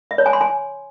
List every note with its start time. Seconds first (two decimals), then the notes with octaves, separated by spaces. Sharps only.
0.11 E5
0.18 C#5
0.26 G#5
0.33 C6
0.41 G#5